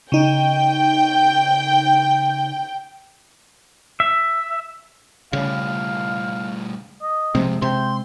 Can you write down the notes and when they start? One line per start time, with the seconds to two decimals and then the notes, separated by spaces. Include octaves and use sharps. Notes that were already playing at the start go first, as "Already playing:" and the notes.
0.12 C#3 D#4 G5
4.00 E5
5.33 G2 C#3 A3 F5
7.02 D#5
7.35 C3 F3 G#3 C4 A4
7.62 C3 G5 C6